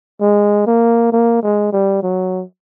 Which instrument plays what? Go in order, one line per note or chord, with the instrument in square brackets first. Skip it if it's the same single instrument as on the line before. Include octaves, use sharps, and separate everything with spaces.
[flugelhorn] G#3
A#3
A#3
G#3
G3
F#3